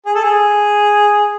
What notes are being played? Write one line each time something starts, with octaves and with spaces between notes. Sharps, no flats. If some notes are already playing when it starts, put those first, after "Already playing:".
G#4
A4
G#4